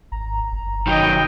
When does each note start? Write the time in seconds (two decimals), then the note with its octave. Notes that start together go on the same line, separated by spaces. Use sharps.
0.12 G#1 A#5
0.53 G1
0.87 D#3 F#3 D#5 G5 B5